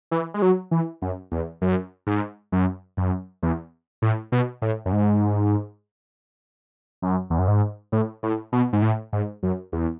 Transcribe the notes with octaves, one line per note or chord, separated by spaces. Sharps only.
E3
G#3
F#3
E3
F#2
E2
F#2
G#2
F#2
F#2
E2
A2
B2
A2
F#2
G#2
F#2
E2
F#2
G#2
A2
A2
B2
G#2
A2
G#2
F#2
E2